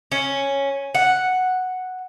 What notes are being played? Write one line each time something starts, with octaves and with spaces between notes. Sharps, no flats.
C#4
F#5